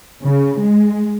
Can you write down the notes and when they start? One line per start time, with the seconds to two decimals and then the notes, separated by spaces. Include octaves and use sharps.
0.23 C#3
0.60 G#3